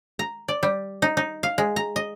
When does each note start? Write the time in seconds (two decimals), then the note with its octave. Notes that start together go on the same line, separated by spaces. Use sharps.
0.19 A#5
0.48 D5
0.63 G3
1.02 D#4
1.17 D#4
1.43 F5
1.58 G#3
1.76 A#5
1.96 D#5